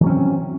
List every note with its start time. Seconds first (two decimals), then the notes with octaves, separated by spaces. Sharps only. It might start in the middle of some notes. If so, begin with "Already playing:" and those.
0.01 E3
0.04 F#3
0.07 C#4
0.10 C4